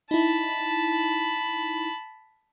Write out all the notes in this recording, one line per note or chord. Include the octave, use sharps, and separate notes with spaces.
D#4 E4 A5 B5